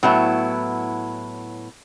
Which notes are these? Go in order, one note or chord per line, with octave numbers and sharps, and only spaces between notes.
A2 F#3 B3 E4